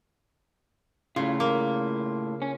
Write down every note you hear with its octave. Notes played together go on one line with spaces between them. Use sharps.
A2 C#3 F4
A#3
C#4